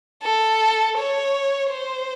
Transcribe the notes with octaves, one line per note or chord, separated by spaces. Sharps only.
A4
C#5
C5